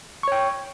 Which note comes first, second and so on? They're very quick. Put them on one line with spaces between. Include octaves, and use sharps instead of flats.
C#6 C#5 G5